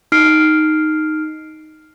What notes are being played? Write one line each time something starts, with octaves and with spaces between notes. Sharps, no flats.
D#4 F6 C7 D7